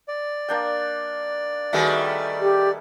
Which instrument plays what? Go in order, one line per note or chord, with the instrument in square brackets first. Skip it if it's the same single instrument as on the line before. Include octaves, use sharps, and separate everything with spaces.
[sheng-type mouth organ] D5
[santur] A#3 D4 G5
[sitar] D#3 G3 A3 [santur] F#4 G#4 B4
[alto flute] G4